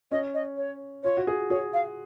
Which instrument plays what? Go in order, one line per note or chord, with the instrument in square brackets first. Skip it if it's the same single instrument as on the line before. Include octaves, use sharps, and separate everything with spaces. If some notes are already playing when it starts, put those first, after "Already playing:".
[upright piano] C#4 [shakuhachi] D#5
[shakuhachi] D#5
C#5
[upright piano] F4 [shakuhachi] C#5
[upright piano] F#4
G#4
[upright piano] G#4 [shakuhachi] C#5
[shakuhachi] F5